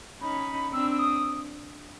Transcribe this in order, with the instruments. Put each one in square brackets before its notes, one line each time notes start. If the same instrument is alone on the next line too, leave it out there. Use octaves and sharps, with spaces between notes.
[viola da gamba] C#4 D#4 [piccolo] B5
[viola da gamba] C4 D4 [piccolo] E6
[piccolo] E6
D#6